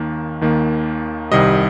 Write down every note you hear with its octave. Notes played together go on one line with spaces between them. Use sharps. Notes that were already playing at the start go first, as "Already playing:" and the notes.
Already playing: D#2 D#3 A#3
D#2 D#3 A#3
C2 C3 D#3 G3 D#5